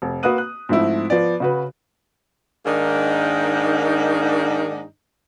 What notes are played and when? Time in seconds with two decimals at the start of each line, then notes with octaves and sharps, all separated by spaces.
0.02 F1
0.23 A#3 F#4 B4 D#6 F#6 D#7
0.38 F#6
0.69 G#2 F3 A3 C4 E4
1.10 F3 B3 D5
1.40 C#3 F#4 B4
2.66 G#2 D#3 A#3 D4 D#4